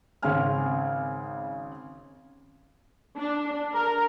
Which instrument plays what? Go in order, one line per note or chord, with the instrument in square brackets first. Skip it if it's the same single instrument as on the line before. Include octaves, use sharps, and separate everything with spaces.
[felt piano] G#1 C#3 C4 C#4 G#5 F6
[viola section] D4
A#4